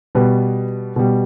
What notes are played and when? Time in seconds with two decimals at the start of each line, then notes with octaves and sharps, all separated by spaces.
0.15 B2 G3 B4
0.96 B2 G3